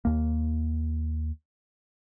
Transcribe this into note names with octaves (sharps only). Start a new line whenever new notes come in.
D#2 A#3